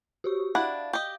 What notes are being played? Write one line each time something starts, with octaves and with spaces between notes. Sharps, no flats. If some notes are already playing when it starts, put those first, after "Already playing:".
F#4 G4 C#6
D4 E4 F5 F#5
G4 D#5